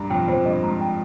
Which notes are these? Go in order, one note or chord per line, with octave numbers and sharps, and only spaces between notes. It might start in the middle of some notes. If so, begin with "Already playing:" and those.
Already playing: G2 A#5
F2 G5
F2 C5
G2 D#5
G#2 A#5
G5